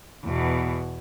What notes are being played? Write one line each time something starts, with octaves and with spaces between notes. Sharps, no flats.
E2 B2